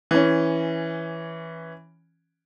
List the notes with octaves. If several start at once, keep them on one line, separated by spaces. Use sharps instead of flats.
E3 C#4